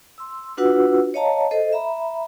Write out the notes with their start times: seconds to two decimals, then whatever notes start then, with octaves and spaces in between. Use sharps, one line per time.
0.18 C6 E6
0.57 D4 F4 F#4 B4 F#5 E6
1.14 C#5 D#5 F5 A5 A#5
1.51 A4 C5 D#5
1.73 E5 A#5 B5